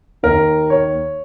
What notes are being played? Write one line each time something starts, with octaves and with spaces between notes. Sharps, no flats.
D#2 D#3 A#4
C#5